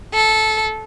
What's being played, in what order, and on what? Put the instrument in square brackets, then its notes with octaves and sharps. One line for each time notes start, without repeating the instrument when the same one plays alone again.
[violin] A4